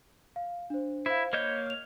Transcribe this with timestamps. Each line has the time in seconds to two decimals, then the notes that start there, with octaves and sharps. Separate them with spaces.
0.36 F5
0.70 D4 C5
1.06 E4 C5 F5
1.33 A#3 C#5 D#5 G6
1.66 F6 F7